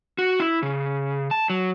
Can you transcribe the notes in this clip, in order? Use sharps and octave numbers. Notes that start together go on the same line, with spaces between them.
F#4
E4
C#3
A5
F#3